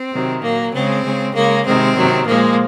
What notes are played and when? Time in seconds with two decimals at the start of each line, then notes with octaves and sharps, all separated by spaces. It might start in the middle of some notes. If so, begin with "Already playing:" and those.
Already playing: C4
0.12 C3 D#3 F#3
0.42 A#2 F#3 A#3
0.73 C#3 G#3 C4
1.04 C#3 G#3
1.34 C#3 G#3 A#3
1.66 C3 D#3 G#3 C4
1.96 C3 D#3 F#3
2.26 A#2 F3 G#3 A#3